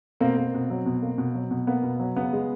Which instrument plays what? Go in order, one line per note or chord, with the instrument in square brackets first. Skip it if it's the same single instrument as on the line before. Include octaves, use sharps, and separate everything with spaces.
[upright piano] B2 A#3 C4
A#3
B2
F#3
B2
A#3
B2
F#3
B2
A#3 B3
B2
F#3
C#3 B3
G#3